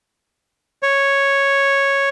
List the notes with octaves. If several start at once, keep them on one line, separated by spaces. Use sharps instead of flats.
C#5